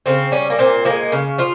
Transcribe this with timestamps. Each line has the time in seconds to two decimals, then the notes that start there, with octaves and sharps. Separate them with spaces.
0.06 C#3 C4
0.32 G3 C#4
0.50 A#3
0.59 A#2 C4
0.85 F3 G#3 A#3
1.12 C#3
1.38 F3 F4